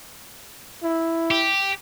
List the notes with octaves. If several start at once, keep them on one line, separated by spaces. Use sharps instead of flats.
E4
G4